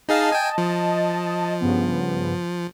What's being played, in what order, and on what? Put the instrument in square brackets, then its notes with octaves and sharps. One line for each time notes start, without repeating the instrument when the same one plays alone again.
[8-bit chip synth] D#4 G#4 F5 [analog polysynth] D#5 A5
[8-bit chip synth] G5 G#5
F3
[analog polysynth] G2 C#3 B3